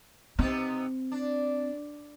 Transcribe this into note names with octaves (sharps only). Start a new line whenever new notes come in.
C3 B3 C4 D#4
D4